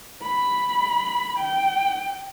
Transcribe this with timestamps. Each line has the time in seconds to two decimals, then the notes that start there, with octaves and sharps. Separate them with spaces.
0.22 B5
1.39 G5